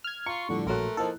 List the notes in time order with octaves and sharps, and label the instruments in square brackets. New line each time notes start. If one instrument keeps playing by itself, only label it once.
[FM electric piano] F6 G#6
[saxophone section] F4 [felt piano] A#5 [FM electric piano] C#6
[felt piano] A2 F3 G3 [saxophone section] D3
[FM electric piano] A#1 F#3 [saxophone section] A3 A4 A#4 [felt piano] C6 F#6
[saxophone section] F3 A#3 D#4 [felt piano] E4 A5 [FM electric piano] A4